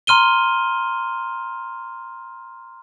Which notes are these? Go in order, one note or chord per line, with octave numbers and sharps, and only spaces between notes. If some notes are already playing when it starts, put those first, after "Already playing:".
A#5 C6 F6 D#7 G7